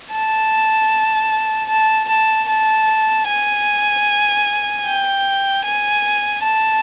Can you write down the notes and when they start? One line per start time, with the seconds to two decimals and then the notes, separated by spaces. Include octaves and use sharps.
0.12 A5
1.69 A5
2.08 A5
2.48 A5
3.28 G#5
4.86 G5
5.65 G#5
6.43 A5